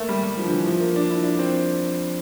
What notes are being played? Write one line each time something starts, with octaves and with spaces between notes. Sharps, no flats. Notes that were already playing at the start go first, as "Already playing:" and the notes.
Already playing: A3 A#3
G3
G3
F3
D3
E3
F3
A#3
D4
E4
D4
C4